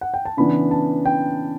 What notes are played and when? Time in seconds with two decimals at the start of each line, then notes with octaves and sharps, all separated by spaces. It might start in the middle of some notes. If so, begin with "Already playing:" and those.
0.01 F#5
0.14 G5
0.25 A5
0.37 C#3 E3 B3 D4 B5
0.71 A5
1.05 G5